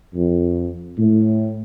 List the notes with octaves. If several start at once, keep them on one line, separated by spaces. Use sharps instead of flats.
F2
A2